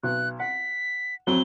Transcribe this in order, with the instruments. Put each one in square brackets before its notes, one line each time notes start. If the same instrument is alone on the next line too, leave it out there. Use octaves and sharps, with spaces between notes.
[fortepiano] B1 [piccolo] F#6
[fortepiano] F#5 [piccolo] B6
[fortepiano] F2 F#3 [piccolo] G7